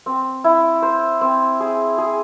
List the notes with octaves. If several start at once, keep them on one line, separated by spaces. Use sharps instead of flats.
C4
E4
C5
C4
G#4
G#4